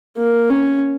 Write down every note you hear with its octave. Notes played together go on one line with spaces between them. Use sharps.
A#3
C#4